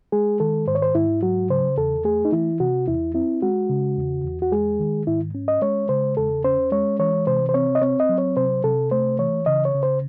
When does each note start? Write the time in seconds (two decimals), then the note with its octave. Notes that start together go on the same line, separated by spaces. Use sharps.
0.12 G#3 G#4
0.40 D#3 A4
0.67 G#2 C5
0.75 C#5
0.82 C5
0.95 G#2 E4
1.22 F#3 F#4
1.50 C#3 C5
1.77 E2 A4
2.05 A3 G#4
2.25 D#4
2.32 E3 E4
2.60 C3 F#4
2.87 E2 E4
3.14 C4 E4
3.42 G#3 F#4
3.70 C#3
3.97 E2
4.24 E2
4.42 F#4
4.52 G#3 G#4
4.80 D#3
5.07 G#2 E4
5.35 C#4
5.48 D#5
5.62 G#3 C#5
5.89 C#3 C5
6.17 E2 A4
6.44 C#4 C5
6.72 G#3 C#5
6.99 E3 C#5
7.27 C3 C5
7.49 C5
7.54 C4 C#5
7.75 D#5
7.82 C4 C#5
8.00 D#5
8.09 F#3
8.18 C#5
8.37 C3 C5
8.64 C3 A4
8.91 A3 C5
9.19 E3 C#5
9.46 C#3 D#5
9.65 C#5
9.74 C#3
9.83 C5